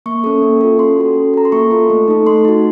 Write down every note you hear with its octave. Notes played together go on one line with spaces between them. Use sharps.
A#3 C#6
C#4 A4
A#3
F4 A4
C#4 C6
F#4 A4
C#4
A4 A#5
C6
A#3 C#6
F4 A4
A3
D#4 A4
A3 C6
D#4 F#4